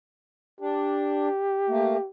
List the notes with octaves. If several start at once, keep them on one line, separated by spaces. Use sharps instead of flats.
D4 G4
A3 A#3